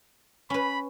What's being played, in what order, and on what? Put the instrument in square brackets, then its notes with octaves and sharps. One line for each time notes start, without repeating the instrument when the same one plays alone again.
[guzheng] C#4 B4 [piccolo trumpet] B5